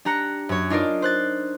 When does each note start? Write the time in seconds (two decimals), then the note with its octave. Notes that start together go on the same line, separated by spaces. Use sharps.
0.05 D4 G4 A#5 F#6 C#7
0.49 F#2 C#5
0.70 D4 D#4 F4 A#4 D5
1.02 C5 F#6 A6